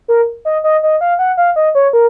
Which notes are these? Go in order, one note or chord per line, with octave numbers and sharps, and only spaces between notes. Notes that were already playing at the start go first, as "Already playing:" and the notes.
A#4
D#5
D#5
D#5
F5
F#5
F5
D#5
C#5
A#4